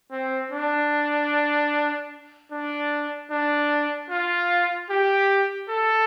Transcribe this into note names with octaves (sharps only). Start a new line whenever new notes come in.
C4
D4
D4
D4
F4
G4
A4